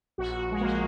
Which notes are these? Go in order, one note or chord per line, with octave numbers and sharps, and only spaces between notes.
A#1 F#4
G#3
F3 A#3